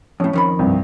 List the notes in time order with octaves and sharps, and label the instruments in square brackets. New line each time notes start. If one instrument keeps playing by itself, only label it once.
[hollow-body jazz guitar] F2 A2 [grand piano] C#4
[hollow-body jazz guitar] F2 D#3 B5
[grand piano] C2 G2